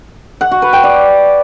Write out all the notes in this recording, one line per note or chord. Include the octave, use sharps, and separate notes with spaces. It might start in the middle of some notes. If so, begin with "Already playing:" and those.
F#5
F#4
B4
G5
D5